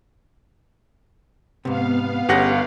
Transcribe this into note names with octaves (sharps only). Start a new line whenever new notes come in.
G#2 C3 B3 F5
G1 C#4 G4 G#4 F#5 A#6